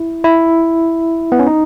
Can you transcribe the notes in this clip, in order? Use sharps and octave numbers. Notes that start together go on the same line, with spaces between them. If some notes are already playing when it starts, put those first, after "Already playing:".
Already playing: E4
E4
B3
C#4
D#4